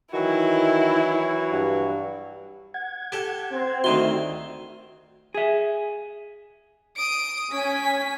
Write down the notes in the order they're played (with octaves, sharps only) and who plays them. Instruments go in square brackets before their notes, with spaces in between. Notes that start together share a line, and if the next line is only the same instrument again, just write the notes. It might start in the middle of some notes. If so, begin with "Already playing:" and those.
[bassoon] D#3 [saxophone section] E3 F#3 F#4 [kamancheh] E4
[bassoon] G2
[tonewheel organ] F#5 G#6
[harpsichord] G4 A4
[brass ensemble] C4
[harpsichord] D2 D#3 C6 [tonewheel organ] F#4 E5
[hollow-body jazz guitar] G#4 E5
[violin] D#6 D7
[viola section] C#4 G#5 [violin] B6